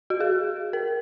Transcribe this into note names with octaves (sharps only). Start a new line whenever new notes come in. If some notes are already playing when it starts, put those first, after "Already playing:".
F#4
G#4
A#4